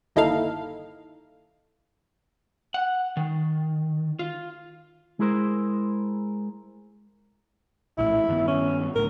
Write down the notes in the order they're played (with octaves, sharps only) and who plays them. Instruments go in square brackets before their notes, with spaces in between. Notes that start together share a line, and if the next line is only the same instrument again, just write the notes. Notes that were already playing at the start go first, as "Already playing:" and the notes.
[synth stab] G1 D#2 D#4 E4 A4 F5
[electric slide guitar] F#5
D#3
F4
[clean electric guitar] G#3 E4 G#4 A#4 C5
[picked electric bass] A#1 A2 [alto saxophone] E4
[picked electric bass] G2 D#3 B3
[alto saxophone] C#4
[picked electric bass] D2 A2 [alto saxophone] A#4